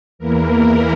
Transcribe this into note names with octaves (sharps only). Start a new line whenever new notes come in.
E2 E3 A#3 E4 A#4